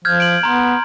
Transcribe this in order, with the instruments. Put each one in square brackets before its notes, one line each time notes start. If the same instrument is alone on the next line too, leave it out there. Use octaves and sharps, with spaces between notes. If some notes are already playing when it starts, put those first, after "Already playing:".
[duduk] F3 [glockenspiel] F6 G6 G#6
[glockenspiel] D7 F#7
[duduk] B3 [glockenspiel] A#5 C6